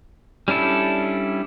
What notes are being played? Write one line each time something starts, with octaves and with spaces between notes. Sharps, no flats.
G3 C#4 D4 E4 A4